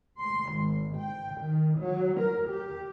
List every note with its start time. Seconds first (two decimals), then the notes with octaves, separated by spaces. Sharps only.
0.19 C6
0.53 G#1
0.97 G5
1.40 D#3
1.78 F#3
2.19 A#4
2.50 G4